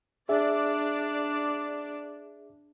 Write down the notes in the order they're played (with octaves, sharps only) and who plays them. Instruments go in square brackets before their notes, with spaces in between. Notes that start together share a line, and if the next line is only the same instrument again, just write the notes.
[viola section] D4 D5 [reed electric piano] G#4 E5